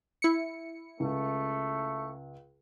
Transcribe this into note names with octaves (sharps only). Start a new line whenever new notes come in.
E4 C#7
C#2 A3